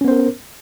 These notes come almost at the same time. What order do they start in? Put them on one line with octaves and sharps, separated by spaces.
C#4 B3 C5 A#4